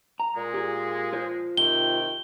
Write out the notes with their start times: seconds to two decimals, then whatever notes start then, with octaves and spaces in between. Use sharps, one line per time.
0.20 A#5
0.35 A#2 G#3
0.54 G4 G#4
1.13 F4 C5
1.57 C3 D#3 G5 G7